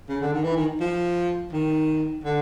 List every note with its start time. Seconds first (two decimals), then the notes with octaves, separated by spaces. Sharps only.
0.09 C#3
0.21 D3
0.33 D#3
0.44 E3
0.57 D#3
0.80 F3
1.53 D#3
2.24 D3